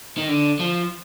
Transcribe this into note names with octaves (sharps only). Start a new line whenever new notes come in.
D#3
D3
F3